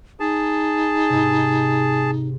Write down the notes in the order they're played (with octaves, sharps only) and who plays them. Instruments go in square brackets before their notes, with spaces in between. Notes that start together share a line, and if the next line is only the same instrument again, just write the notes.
[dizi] D#4 [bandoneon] G#4 A5
[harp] G#2 C3